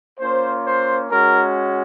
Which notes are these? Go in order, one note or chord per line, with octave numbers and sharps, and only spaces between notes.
A#3 C#4 F4 C5
C5
G#3 C#4 F#4 A#4